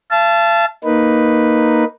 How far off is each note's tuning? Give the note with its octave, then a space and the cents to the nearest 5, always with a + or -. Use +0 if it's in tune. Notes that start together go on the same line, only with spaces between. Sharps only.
F5 -45 A5 -10
A#3 +0 D#4 +0 B4 +0